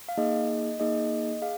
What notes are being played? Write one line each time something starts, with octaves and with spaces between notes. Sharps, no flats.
F5
A#3 D#4 G#4 D#5
A#3 D#4 G#4 D#5
G#4 F5